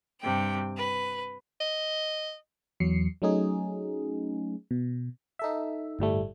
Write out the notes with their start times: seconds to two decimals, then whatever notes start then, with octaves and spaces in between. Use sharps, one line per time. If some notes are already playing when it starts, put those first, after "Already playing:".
0.21 G2 C3 G5
0.78 B4
1.60 D#5
2.80 E2 F#3 C7 C#7
3.22 F#3 A3 C#4 D#4 G#4
4.71 B2
5.39 D#4 A4 E5
5.99 G1 A2 G3 A3